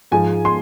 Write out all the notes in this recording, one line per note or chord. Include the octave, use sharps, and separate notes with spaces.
G#2 F3 G#3 G#5
C6